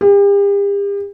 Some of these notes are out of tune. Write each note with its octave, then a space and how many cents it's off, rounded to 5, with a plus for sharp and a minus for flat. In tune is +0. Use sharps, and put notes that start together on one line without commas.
G4 +40